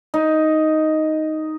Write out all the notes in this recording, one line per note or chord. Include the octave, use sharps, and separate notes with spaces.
D#4